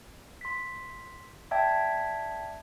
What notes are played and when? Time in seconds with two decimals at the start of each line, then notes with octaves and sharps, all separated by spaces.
0.41 C6 B6
1.51 D5 E5 G5 A5 G#6